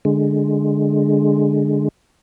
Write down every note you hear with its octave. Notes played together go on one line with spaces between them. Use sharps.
D3 G#3